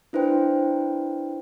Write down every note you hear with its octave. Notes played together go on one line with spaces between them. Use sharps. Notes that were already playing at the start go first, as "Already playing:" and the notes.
D4 E4 B4 C5 G5